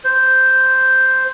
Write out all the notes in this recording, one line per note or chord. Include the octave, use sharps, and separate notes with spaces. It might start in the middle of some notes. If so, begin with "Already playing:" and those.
C5